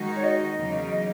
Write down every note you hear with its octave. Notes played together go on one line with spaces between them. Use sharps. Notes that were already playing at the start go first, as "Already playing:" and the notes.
Already playing: D#3 G#3 D#4 F#4
C#5
D#5
E2 C#3 F#3 A#3 D#4
D#5